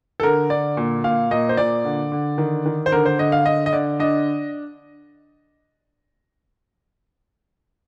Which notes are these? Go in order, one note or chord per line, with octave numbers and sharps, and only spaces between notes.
A4
D3 A#4
D3 D5
A#2
A#2 F5
A#2 D#5
C5
A#2 D5
D3
D3
D#3
D#3
C5
D3 A#4
C5
D3 D#5
F5
D3 D#5
D#5
D3 D5
D4 D#5